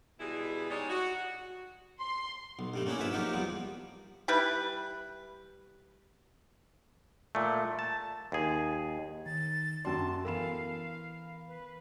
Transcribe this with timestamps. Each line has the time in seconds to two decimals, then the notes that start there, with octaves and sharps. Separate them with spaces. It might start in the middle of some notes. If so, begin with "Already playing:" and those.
0.20 B2 E3 G3 G#3 E4 G#4
0.70 G3 G#3 D#4 C#5 D5
0.90 F#4
1.99 C6
2.59 B1
2.74 G2 G3 A3
2.86 A3 A#3 C#4 D4 E4 G#4
2.99 G#2 F4 B4 E5
3.13 F3 F#3 A#3 D#4 F4 G4
3.33 E2 F3 G3
4.28 G3 E4 B4
7.35 A#2 A3
7.79 A5
8.32 D#2 G#4
9.26 D#3 A6
9.85 F#2 F#4 D5 G5 A5 C6
10.25 E3 B3 A4 A#4 F5 B5 E7
11.48 B4